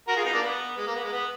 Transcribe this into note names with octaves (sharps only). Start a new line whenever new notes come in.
F#4 A#4
F4 G#4
B3 D#4
A#3 D4
B3
G#3
A#3
B3
G#3
B3